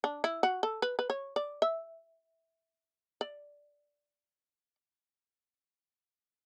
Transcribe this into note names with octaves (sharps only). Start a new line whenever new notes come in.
D4
E4
F#4
A4
B4
B4
C#5
D5
E5
D5